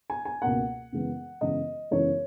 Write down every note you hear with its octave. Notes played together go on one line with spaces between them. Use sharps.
G#5
G#5
C#2 B2 A#3 F#5
F#2 C#3 E3 G#3 B3
F#2 C#3 E3 G#3 B3 D#5
F#2 C#3 E3 G#3 B3 C#5